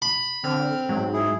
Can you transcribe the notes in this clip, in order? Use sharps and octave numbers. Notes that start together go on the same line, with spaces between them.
B5
D3 C4 F6
G#2 F#3
E4 G#4